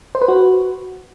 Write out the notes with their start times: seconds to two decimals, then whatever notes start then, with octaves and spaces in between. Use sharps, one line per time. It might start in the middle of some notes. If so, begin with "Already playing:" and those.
0.15 C5
0.22 B4
0.28 F#4